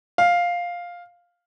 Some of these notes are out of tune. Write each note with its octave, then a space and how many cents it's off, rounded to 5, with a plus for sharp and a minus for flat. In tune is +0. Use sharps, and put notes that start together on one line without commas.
F5 +5